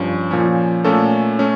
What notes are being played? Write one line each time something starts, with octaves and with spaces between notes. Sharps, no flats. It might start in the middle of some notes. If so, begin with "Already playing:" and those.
Already playing: G2 F3 C#4
A#2 F3 C#4
A#2 A3 C#4 A4
A3 C#4